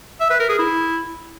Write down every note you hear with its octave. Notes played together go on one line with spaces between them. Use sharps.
E5
B4
A#4
G#4
E4